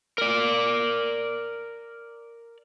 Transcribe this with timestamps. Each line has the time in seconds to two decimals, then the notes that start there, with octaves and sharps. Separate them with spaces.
0.18 A#4 D5